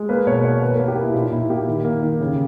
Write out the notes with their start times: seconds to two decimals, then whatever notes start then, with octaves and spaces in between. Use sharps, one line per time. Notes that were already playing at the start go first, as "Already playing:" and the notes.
Already playing: G#3
0.09 A#3 B4
0.27 B2 C#5
0.44 A#3 C#5
0.62 B2 B4
0.75 A#3 A#4
0.88 G4
0.97 A#3 E4
1.14 A#2 D#4
1.32 A#2 E4
1.50 A#3 G4
1.68 D#3
1.85 A#3
2.03 D#3
2.21 C#3